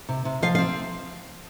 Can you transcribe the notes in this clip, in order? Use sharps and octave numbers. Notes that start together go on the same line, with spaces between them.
C3
C3
F3 F5
F5
C4